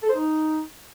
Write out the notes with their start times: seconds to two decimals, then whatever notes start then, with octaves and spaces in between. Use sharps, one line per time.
0.03 A4
0.09 C5
0.15 D#4